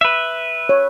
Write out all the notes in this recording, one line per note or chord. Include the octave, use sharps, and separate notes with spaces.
B4 E5
C#5